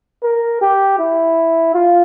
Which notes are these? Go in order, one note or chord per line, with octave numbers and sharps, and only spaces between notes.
A#4
G4
E4
F4